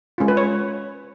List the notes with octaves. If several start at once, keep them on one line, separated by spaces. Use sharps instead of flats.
G#3 C#4 F4
B4
C#5